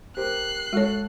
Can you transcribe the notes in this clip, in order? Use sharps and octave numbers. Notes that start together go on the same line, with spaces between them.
G4 A#4 C5 F#6 C7
G#3 F#4 A4 C#5